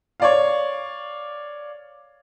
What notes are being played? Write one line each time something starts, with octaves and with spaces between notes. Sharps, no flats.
C#5 D5 F5